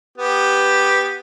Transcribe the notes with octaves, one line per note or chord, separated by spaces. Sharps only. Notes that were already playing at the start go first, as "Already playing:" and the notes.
B3 G4